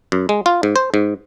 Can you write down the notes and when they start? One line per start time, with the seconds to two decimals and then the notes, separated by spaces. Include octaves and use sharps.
0.12 F#2
0.29 G#3
0.46 F4
0.63 G#2
0.76 C5
0.94 G#2